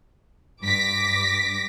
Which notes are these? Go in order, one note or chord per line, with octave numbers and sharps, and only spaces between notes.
G2 D6 A#6 B6